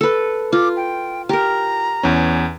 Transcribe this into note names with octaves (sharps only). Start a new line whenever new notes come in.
A4 B4
F4 D6
G5
G4 A#4 A#5
E2 E3 C#4